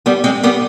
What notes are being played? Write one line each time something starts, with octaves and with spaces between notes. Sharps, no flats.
G3 B3
G#3 C4
G3 B3